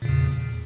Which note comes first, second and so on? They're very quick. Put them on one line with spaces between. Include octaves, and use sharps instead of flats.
A#2 C#3 E2